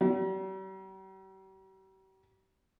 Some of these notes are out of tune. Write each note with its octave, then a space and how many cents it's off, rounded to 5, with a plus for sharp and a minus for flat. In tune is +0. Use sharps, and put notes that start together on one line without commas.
G3 -45